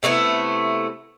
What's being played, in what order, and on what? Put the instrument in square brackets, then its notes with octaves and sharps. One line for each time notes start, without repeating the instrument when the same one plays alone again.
[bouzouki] C3 A3 B3 E4